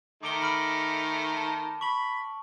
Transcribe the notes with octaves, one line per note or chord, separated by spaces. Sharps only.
D#3 A3 D#4 D6 D7 G7
B5 F6 D7
A5
B5 C#6 F#7